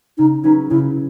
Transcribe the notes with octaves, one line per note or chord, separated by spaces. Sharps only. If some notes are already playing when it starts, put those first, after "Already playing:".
C#3 D#4
F#3 C#4 D#4 G#4 B4
C#3 E4